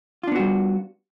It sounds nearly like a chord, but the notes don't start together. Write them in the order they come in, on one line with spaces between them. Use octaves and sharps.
F4 D4 B3 F#4 G3